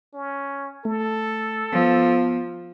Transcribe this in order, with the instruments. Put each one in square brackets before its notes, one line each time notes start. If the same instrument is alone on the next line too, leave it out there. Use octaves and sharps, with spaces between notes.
[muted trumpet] C#4
[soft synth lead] A3 [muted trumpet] A4
[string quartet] F3 [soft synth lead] B3